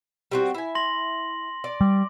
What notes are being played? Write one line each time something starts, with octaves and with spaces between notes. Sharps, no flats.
G3 C4 F#4
E4 G#5
C6 A#6 F#7
D5
G3 D6